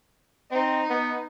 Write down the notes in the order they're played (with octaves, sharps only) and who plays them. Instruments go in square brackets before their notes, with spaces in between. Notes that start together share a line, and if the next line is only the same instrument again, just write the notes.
[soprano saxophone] C4 [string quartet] D#4
[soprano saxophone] B3